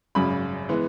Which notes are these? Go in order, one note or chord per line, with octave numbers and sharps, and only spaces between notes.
G#1 F#2 C#3 B5
E3 G#3 B3